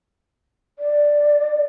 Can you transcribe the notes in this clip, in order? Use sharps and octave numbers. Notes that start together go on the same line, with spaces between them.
D5